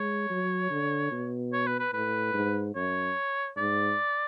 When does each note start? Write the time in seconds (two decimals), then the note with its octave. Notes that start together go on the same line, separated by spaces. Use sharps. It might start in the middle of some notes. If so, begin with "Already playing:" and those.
Already playing: G#3 C#5
0.30 F#3
0.70 D3
1.11 B2
1.53 C#5
1.66 B4
1.79 B4
1.93 A2 B4
2.34 G#2
2.75 F#2 C#5
3.57 G#2 D5